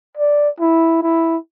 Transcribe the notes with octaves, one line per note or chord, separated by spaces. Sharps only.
D5
E4
E4